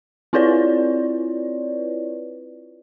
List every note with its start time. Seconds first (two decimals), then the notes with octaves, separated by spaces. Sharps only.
0.33 C4 E4 F4 B4 C#5 D5